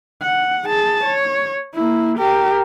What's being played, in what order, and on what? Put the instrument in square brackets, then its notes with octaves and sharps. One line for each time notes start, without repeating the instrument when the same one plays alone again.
[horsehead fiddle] F#5
G#4 A5
C#5
A#3 E4
G4 A#4